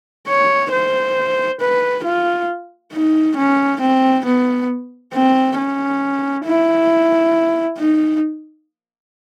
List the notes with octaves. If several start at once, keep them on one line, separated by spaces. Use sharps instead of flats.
C#5
C5
B4
F4
D#4
C#4
C4
B3
C4
C#4
E4
D#4